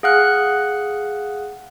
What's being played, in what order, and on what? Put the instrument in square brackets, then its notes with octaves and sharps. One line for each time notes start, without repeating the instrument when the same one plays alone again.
[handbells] G#4 F5 F#5 F6 F#6